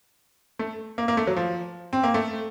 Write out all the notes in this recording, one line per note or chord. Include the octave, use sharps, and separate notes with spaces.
A3
A#3
A#3
A3
F#3
F3
C4
A#3
A3